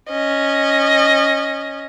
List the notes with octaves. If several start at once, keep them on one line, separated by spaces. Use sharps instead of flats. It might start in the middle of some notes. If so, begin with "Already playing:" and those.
C#4 D#5